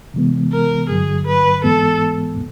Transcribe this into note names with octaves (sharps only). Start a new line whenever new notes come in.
C3 E3 G#3 B3
A#4
G2 D3 F#3 G#4
B4
G#2 E3 G#3 B3 A4